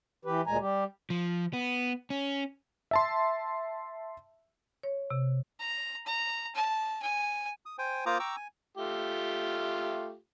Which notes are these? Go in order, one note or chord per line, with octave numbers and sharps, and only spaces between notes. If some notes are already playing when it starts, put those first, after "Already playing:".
E3 G4 B4
D2 A#2 G#3 G#5 A#5
G3 G4
F3
B3
C#4
E5 A5 C6
C#5
C3
A#5
A#5
A5
G#5
D#6
C5 G5 G#5
A#3 F4 C5 A#5 D6 D#6
G5 A#5 C#6 D6 E6
G#5
A3 F4 G4